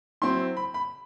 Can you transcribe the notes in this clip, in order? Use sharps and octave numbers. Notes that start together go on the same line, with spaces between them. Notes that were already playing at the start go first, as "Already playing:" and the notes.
F#3 C4 E4 C6
B5
B5